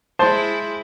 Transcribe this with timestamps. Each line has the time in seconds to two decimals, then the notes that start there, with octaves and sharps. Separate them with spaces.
0.19 G#3 E4 C5 A5 C6